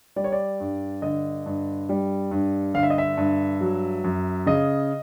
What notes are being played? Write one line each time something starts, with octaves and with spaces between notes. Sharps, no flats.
G3 D5
C#5
D5
G2
D3 D#5
G2
G3
G2
D3 F5
E5
D#5
E5
G2
F#3
F#2
C#3 D#5